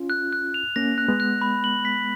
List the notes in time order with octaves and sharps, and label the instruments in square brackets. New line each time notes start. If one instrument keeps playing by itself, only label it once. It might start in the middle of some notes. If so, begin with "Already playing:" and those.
Already playing: [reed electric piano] C#4 F4
[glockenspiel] F#6
F#6
F7
[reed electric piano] A#3 C#4 [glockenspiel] A#6
[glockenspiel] F#6
[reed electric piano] G#3 B3
[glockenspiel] F#6
B5
F#7
B6